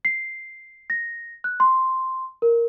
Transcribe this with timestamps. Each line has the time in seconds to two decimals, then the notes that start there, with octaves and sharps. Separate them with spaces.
0.05 C7
0.90 A#6
1.44 F#6
1.60 C6
2.42 A#4